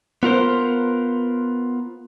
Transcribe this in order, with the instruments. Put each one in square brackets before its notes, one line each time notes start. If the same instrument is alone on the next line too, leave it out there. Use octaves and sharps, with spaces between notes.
[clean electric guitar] B3 F4 A#4 C5